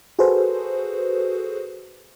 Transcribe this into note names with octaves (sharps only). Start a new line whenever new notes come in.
F#4 G#4 A4 B4 C5